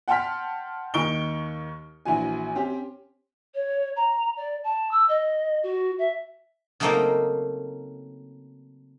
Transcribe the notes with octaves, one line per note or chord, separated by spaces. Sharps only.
F#5 G5 A5 C6 F6 B6
D#2 D#3 C#6 D7 G7
A#1 E3 F#4 G#5
C4 C#4 G4
C#5
A#5
D5
A5
E6
D#5
F#4
E5
C#3 F#3 A3 A#3 C4 D#4